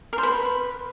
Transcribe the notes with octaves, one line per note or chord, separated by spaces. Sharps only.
A#4
C5
B4